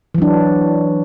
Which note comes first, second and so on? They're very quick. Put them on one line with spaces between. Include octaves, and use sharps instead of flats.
E3 F#3 D4